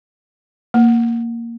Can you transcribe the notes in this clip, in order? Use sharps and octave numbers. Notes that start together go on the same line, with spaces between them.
A#3